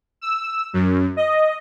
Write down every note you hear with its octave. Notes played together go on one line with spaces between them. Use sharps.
E6
F#2
D#5